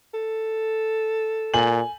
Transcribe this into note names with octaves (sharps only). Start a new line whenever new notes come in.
A4
A#2 G#5 F#7